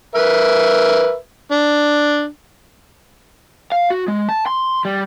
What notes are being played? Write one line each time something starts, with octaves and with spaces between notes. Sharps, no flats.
A#4 B4 E5
D4
F5
F#4
G#3
A5
C6
G3